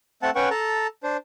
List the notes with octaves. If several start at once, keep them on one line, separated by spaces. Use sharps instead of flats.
A3 C4 F#5 A5
C#4 B4 F#5 G5 C#6
A4 A5 A#5
D4 C5